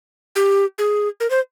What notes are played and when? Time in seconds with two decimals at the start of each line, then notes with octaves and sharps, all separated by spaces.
0.36 G4
0.78 G#4
1.20 A#4
1.30 C5